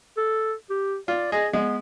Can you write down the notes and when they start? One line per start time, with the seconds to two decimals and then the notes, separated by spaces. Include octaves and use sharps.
0.17 A4
0.70 G4
1.08 F4 D5
1.32 G#4 D#5
1.53 G#3 B3